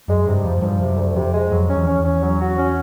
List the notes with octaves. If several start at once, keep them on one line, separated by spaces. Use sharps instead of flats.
F#2 G#3
G2 C3
F2 F3
G#2
G2 F3
F#2 C3
D2
F2 C3
G#3
F2 F#3
C#4
E2
C#4
E2
C#4
F#3
F#4
C#4